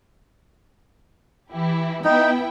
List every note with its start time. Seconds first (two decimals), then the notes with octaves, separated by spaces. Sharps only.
1.52 E3 E4 G4
2.04 B3 D#4 E4 G5